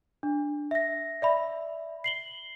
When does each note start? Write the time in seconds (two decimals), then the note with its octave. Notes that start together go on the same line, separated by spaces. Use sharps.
0.23 D4
0.71 E5 A#6
1.22 D5 E5 B5
2.04 C7 F#7 G7